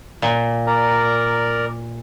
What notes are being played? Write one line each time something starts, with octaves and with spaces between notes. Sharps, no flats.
A#2
A#4 D5 A#5